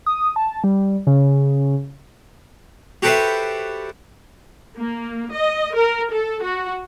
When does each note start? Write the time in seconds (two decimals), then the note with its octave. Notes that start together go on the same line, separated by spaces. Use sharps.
0.06 D#6
0.36 A5
0.64 G3
1.07 C#3
3.02 F#4 G4 A4 B4 C5 E5
4.76 A#3
5.33 D#5
5.75 A#4
6.11 A4
6.43 F#4